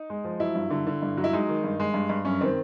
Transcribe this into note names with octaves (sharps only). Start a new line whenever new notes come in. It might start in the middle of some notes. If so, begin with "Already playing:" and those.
Already playing: D#4
G#3
F3
F#3 E4
G2
D3
D3
G2
F#3
E4
G#3 D#4
D#3
G2
G#3
G2
G2
F#2 C#4
D#3 C4